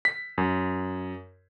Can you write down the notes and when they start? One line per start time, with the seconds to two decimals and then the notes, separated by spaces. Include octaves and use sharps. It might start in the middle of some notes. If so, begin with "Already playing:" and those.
0.05 B6
0.38 F#2